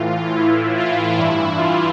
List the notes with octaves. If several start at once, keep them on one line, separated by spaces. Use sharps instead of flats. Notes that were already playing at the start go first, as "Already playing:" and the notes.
Already playing: A2 E3 F4
E4
F4
G2 E3 E4
F4